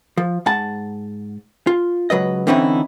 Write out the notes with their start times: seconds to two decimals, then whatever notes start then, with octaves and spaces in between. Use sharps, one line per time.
0.17 F3
0.46 G#2 F#5 A5
1.67 F4
2.10 C#2 F#3 B4 D#5
2.47 D3 E3 C4 C#4 D#4 E4